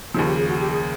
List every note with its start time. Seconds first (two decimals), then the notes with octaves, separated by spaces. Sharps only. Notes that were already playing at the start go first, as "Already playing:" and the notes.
0.14 D#2 C#3 F3 D#4
0.27 G4
0.38 G#4
0.48 F#4
0.60 G4
0.70 G#4